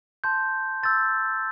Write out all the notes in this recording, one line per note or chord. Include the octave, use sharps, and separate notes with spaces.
A5 C6 G6
C6 E6 G6 A6